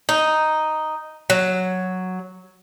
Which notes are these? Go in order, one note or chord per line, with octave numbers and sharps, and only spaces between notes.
D#4
F#3